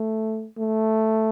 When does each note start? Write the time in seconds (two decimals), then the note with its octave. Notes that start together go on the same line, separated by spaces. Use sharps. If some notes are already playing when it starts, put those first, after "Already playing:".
Already playing: A3
0.58 A3